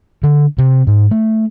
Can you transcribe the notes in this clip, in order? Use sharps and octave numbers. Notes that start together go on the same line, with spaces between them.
D3
C3
G#2
A3